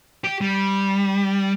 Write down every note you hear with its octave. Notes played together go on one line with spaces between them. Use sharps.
G4
G3